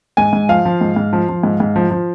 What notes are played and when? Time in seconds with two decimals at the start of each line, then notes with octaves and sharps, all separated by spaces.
0.17 G#2 G#5
0.33 G#2
0.49 F3 F5
0.65 F3
0.81 G#2
0.96 G#2
1.13 F3
1.29 F3
1.43 G#2
1.60 G#2
1.76 F3
1.91 F3